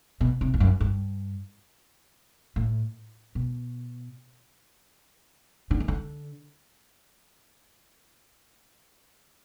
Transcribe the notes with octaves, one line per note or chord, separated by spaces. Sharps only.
B2
C3
E2
F#2
G2
A2
B2
D3
E3
D3